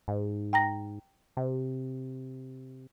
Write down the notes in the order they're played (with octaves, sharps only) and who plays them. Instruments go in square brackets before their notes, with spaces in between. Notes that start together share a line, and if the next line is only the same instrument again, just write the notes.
[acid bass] G#2
[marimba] G5 A#5 A#6
[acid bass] C3